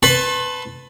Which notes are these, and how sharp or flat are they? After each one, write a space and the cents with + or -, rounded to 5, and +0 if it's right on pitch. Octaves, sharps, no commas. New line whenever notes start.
B4 +15 A5 +0 C6 +45